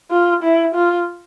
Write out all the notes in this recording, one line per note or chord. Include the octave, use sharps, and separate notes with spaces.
F4
E4
F4